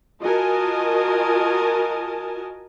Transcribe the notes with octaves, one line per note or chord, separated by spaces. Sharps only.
F4 F#4 A#4 D#5 G#5 A5